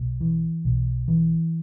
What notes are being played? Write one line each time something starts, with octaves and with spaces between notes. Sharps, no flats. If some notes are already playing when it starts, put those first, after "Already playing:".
Already playing: B1
E3
B1
E3